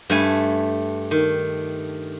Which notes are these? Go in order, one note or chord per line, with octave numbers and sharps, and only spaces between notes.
G2 A3 G#5
D#3